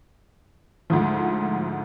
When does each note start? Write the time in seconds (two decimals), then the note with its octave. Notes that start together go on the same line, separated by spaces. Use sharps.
0.90 D2 G#2 F3